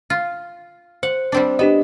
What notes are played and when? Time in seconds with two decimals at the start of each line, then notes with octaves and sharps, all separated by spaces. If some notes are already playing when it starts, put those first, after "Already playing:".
0.10 F4
1.03 C5 F#5
1.32 G3 C4 D4
1.59 B3 D4 G4 D#5